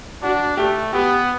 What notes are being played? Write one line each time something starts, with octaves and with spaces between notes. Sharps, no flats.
D4 F#4
A3 G4
B3 G4